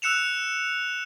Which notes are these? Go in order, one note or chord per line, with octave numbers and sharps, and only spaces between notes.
E6 F#6 C#7 E7 F7